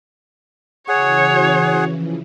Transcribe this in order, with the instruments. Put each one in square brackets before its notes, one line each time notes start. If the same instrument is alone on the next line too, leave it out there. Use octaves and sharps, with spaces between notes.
[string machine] C#3 E3 F#4 [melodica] G#4 F#5 [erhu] C#5
[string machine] C#3 E3 F3